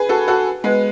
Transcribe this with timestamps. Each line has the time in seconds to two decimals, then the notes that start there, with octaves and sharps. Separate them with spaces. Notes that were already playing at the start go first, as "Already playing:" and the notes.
Already playing: G#4 B4
0.09 F#4 A4
0.28 F#4 A4
0.64 G#3 B3